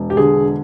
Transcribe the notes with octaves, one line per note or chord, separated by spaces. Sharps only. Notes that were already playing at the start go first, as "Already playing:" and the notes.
Already playing: E1
G4
D3 G#4